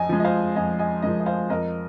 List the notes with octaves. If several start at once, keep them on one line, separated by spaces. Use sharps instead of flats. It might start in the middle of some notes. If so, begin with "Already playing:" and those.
Already playing: F2 D#5 G#5
F3 G#3
D#5
C5 F5
F2 D#5 G#5
D#5 G#5
F3 G#3 A#4 D#5
D#5
C5 F5
F2 A#4 D#5